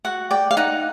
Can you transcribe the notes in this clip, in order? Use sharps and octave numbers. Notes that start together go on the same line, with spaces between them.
F#4 F#5
D5 G5
F5
D#4 F#5